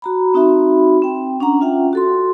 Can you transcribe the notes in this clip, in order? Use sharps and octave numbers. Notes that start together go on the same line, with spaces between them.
F#4 A#5 B5
C4 D#4 F#4 E5 B5
C4 G5
C#4 D4 F#5 A#5
C#4 F4 E5 F#5 G5
F#4 A4 C6